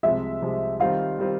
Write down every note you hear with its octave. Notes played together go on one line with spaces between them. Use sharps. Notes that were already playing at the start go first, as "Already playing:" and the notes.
C2 C3 F3 G#3 E5
C2 C3 F3 G#3
D#3 G3 C4 F4 F5
D#3 G3 C4 F4